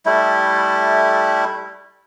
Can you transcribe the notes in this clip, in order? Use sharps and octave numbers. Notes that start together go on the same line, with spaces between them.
G3 A3 E4